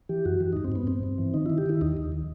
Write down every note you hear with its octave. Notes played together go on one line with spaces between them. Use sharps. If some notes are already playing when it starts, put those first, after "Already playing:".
E3 G4
F#2 F#4
E3
G2 D#4
C4
G2 B3
G2 C4
G2
E3
D#3 D#4
D#3 E4
G4
D#3 E4
D#2 D#4
D#2
D#3